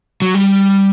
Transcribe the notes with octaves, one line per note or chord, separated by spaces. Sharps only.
F#3
G3